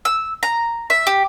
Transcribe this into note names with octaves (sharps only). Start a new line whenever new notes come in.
E6
A#5
E5
G4